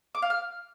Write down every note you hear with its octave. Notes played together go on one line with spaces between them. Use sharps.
D6
F5
F6